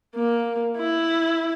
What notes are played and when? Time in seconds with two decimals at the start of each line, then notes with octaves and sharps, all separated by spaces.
0.15 A#3
0.78 E4